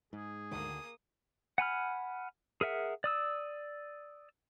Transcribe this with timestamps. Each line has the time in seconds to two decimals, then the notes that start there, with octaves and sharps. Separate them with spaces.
0.13 G#2 G#4
0.51 D2 D3 D#3 A#3 D#6
1.58 F#5 G#5 B5 F6
2.61 G#4 A#4 E5 F#5
3.04 D5 D#6 E6